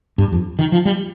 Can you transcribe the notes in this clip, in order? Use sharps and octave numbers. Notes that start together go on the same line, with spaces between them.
G2
F2
D#3
F3
G3